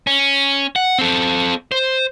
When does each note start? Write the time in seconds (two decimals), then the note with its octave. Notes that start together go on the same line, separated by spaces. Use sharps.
0.07 C#4
0.76 F#5
0.99 C4 A4
1.72 C5